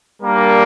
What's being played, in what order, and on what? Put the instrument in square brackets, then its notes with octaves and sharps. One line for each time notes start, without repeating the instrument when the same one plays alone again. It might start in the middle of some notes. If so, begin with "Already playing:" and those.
[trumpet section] G3 A#3 D4 A#4